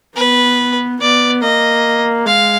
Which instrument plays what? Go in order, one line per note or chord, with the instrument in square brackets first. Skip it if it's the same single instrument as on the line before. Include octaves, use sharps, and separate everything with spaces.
[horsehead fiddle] B3 [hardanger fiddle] B4
[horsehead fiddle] B3 [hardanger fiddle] D5
[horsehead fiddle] A#3 [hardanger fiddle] D#5
[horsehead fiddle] G#3 [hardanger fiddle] F5